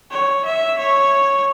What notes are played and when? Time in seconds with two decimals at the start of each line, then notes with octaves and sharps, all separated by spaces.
0.11 C#5
0.45 E5
0.79 C#5